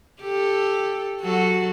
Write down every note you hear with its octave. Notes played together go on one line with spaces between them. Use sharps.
G4 A4
F#3 F#4 A4